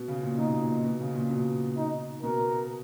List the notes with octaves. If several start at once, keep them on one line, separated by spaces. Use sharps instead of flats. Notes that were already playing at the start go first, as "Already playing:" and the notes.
Already playing: B2
C#3
A#2
B2 D#4
A#2
B2
C#3
A#2
B2
D#4
B2 A#4